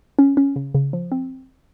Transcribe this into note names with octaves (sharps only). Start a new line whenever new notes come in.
C#4
C#4
C#3
C#3
F3
C4